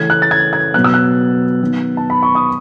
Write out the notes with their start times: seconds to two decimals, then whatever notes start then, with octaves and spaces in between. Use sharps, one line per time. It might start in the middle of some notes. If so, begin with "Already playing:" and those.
Already playing: C#3 E3 A3 C#4 G#6
0.10 F#6
0.22 A6
0.31 G#6
0.53 G#6
0.74 B2 F#3 B3 F#6
0.84 E6
0.94 F#6
1.61 D#3 F#3 B3
1.97 A5
2.10 B5
2.23 C#6
2.35 D#6